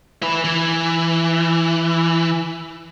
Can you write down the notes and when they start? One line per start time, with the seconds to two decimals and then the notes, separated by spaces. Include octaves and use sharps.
0.23 E4 B4
0.44 E3